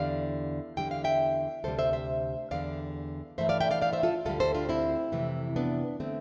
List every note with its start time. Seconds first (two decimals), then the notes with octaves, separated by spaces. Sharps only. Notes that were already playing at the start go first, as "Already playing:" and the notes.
Already playing: E2 D3 G3 D5 F5
0.77 E2 D3 G3 G5
0.91 F5
1.04 E5 G5
1.64 D2 C3 G3 A4 C5
1.78 C5 E5
1.93 C5 E5
2.51 E2 D3 G3 D5 F5
3.38 G2 E3 A3 C5 E5
3.49 D5 F5
3.60 E5 G5
3.71 D5 F5
3.82 D5 F5
3.93 C5 E5
4.03 F4 A4
4.25 D2 D3 G3 F4 A4
4.40 A4 C5
4.54 D4 F4
4.69 C4 E4
5.12 F2 C3 E3 A3
5.56 B3 D4
6.00 D3 A3 C4